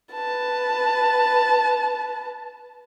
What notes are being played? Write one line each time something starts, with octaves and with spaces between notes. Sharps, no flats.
B4 A5